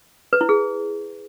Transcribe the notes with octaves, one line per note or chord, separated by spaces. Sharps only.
B4
E4
G#4